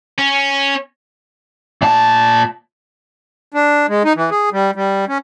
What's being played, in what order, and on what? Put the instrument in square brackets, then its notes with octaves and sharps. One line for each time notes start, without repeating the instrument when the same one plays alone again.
[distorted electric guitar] C#4
[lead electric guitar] A#2 A5
[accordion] D4
G#3
D#4
E3
G#4
G3
G3
C#4